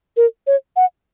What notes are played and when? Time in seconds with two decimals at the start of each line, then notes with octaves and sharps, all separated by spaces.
0.17 A#4
0.47 C#5
0.76 F#5